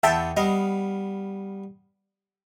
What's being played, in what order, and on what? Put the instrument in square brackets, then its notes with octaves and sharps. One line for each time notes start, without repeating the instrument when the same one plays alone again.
[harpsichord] E2 B3 C6 [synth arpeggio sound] E5 G5 A5
[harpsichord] G3 B3 F5 [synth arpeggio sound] D#5